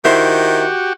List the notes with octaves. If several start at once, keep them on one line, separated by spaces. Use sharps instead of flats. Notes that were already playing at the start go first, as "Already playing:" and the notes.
D#3 E4 F#4 G4 C5 E5